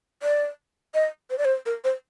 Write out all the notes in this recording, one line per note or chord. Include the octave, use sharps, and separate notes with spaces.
D5
D#5
C5
D5
C5
A#4
C5